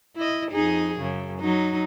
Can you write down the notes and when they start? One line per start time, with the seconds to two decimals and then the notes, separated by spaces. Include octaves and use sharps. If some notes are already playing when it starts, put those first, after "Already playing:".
0.17 E4 D#5
0.51 F2 D#4 G#4
0.99 F#2 C#3
1.41 F#3 D#4